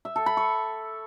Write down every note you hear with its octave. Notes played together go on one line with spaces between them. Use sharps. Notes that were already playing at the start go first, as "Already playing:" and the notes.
E5
A4
B5
C#6